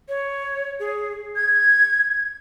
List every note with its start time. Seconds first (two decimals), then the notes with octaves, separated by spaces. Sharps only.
0.09 C#5
0.79 G#4
1.36 G#6